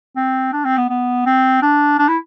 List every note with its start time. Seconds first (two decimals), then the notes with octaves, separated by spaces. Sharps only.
0.16 C4
0.53 D4
0.64 C4
0.77 B3
0.89 B3
1.26 C4
1.62 D4
1.99 D4
2.08 E4